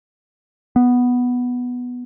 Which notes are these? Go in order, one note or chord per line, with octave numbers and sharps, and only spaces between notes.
B3